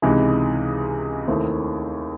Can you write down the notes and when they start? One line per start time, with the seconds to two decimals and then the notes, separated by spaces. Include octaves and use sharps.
0.02 C#2 C3 E3 G#3 D#4
1.28 D#2 D#3 A3 C4 E4